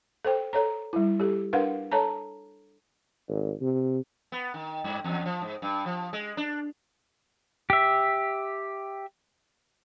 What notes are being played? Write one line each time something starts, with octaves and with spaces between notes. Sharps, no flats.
A4 C5 G5
A4 C#5 A#5
G3 E4
G4 A4
D4 A#4 B4 F5 F#5
A4 C#5 A5 A#5
G#1
C3
B3
D#3
G2
E2
F3
G#2
G2
F3
G#3
D4
G4 E5